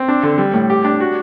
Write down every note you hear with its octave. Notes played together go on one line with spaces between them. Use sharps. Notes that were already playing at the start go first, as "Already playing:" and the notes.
Already playing: C4
D4
D3
G3
A2
G4
D4
F#4